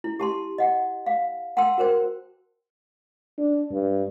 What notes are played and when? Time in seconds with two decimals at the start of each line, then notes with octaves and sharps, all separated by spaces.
0.04 E4
0.19 G4 A5 C6
0.58 D#5 F#5
1.06 F5
1.57 F#5 G5 A5 C6 E6
1.78 F#4 A#4 C5 G5
3.38 D4
3.71 G2